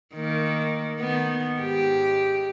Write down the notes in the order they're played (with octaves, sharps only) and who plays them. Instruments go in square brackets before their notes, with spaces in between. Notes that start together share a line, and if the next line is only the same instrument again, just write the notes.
[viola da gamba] D#3 A#3
D#3 B3
G#2 G4